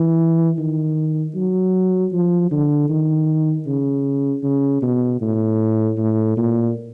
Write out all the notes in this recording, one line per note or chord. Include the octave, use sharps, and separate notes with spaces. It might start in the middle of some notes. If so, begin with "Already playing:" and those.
Already playing: E3
D#3
F#3
F3
D3
D#3
C#3
C#3
B2
A2
A2
A#2